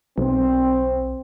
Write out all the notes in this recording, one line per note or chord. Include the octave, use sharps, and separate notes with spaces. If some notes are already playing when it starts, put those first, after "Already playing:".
B1 C4